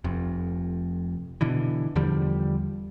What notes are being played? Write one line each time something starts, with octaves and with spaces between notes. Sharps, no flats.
F1 F2
B2 D3 E3
E2 D3 F3 G3